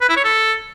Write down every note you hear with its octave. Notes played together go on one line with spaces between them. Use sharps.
B4
E4
C#5
A4